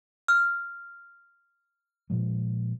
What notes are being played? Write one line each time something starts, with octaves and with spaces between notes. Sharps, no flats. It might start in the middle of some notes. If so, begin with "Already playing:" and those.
F6
A#2 F3 G#3